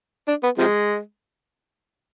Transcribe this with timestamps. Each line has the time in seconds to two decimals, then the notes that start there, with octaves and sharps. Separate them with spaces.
0.28 D4
0.43 B3
0.58 C3 F3 G#3